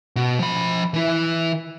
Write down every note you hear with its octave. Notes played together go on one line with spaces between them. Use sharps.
B2
F3 B5
E3 E4